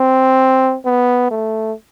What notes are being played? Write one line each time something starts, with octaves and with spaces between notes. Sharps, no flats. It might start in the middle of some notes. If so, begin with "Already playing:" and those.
Already playing: C4
B3
A3